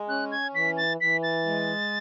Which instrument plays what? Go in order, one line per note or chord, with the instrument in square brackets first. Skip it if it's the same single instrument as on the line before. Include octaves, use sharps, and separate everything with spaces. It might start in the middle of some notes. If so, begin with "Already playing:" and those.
Already playing: [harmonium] G#3
[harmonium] C#4 [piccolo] F#6
[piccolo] G#6
[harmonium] E3 [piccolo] B6
[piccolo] A6
[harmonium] E3 [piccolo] B6
[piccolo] A6
[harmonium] G#3